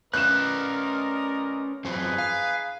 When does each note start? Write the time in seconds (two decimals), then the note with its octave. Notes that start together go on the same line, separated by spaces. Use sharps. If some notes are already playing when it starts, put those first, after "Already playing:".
0.14 C#4 A#4 B4 D5 D#5 F#6 E7
1.85 F#2 F3 C4 D#4 G#4 B4
2.18 F5